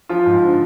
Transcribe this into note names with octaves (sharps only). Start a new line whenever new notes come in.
F3 F4
G#2
D3